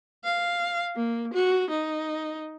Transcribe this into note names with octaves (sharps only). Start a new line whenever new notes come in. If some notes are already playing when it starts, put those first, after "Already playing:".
F5
A#3
F#4
D#4